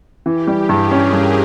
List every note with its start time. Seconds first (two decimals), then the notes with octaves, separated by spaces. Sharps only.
0.25 E3 G4
0.47 G3
0.54 G#4
0.69 G2
0.84 A#4
0.91 C#4
1.13 G2 B4